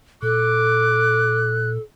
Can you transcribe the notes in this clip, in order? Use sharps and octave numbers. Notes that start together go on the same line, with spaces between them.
A#2 A4 D6 F#6